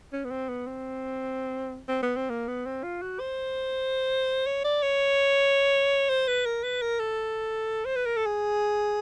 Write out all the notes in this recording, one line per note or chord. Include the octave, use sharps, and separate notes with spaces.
C#4
B3
C4
B3
C4
C4
B3
C4
A#3
B3
C4
F4
F#4
C5
C#5
D5
C#5
C5
B4
A#4
B4
A#4
A4
C5
B4
A#4
A4
G#4